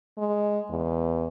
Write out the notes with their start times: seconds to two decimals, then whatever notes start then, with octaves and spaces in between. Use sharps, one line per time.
0.18 G#3
0.69 E2